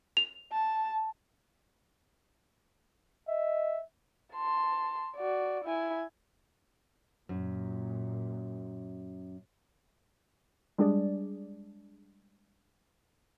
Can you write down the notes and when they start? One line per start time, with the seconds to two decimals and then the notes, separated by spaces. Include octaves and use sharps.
0.17 F7
0.52 A5
3.28 D#5 E5
4.34 A5 C6
5.16 F#4 D5
5.64 E4 G#5
7.29 F#2 A#2
10.78 G3 G#3 D4 G#4 D5